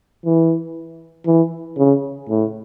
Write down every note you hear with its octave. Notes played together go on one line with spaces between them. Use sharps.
E3
E3
C#3
A2